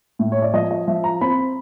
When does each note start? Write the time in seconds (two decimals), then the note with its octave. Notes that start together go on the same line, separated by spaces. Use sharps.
0.19 A2
0.32 C#5
0.42 D5
0.53 F3 D#5
0.71 D#5
0.87 F3 E5
1.04 A#5
1.21 C4 B5